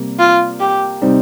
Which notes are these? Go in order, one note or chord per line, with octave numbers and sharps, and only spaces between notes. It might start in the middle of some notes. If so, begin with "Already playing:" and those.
Already playing: C3 G3 A#3
F4
G4
C3 G3 C4 D#4